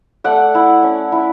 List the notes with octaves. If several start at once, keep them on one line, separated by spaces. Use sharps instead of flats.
A3 D5 F#5
E4
C#4
E4